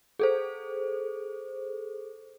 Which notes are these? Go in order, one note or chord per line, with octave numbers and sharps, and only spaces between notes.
G#4 A4 C5